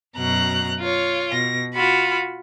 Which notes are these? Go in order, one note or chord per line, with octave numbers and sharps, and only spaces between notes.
F#2 B2 A#5 F#6
F4 C#5
B2 A#6
F4 F#4 B5